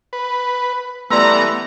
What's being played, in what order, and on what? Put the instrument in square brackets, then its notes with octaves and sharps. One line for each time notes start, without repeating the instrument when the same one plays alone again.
[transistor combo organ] B4
[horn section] E3 G3 A#5 [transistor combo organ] A3 B3 [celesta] D5 C6 E6